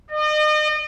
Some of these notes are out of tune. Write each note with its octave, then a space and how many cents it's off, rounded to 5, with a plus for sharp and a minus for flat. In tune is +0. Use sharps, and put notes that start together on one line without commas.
D#5 -40